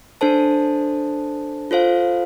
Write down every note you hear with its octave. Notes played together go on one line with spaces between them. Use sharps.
D4 A4 C5 A5
F4 A4 C5 F5